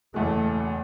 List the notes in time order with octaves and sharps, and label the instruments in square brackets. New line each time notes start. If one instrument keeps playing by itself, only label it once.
[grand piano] F#1 E2 B2 [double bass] A3